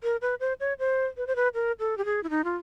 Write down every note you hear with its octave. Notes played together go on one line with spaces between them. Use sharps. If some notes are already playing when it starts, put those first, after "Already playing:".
A#4
B4
C5
C#5
C5
B4
C5
B4
A#4
A4
G4
G#4
E4
D#4
F4